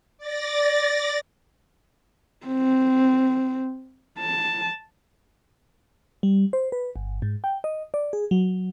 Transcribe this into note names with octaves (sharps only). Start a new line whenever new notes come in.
D5 A6 A#6
C4
A5
G3
C5
B4
G1
G#2
G5
D#5
D5
G#4
F#3